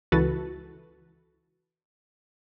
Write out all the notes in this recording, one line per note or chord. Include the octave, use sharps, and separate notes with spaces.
C#2 E3 F#4 A4 B4 A6